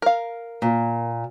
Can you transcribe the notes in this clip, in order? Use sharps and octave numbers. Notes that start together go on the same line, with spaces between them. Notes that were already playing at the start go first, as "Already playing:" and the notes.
A#4 F5
A#2